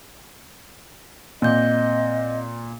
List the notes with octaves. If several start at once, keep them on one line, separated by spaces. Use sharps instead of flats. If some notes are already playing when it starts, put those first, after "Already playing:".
A#2 C4 D#5 G6